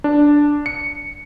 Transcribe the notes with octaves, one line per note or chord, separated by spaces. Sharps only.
D4
C#7